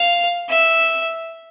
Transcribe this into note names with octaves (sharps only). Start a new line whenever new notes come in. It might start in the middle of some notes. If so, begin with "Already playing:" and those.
Already playing: F5
E5